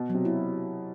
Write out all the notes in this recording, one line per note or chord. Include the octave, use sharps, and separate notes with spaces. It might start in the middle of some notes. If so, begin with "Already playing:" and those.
Already playing: B2
C3 F#3
E4